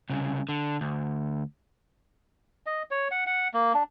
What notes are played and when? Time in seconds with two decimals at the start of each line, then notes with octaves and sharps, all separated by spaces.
0.10 C2 C#3
0.49 D3
0.81 D2
2.66 D#5
2.91 C#5
3.11 F#5
3.27 F#5
3.54 A#3
3.74 D4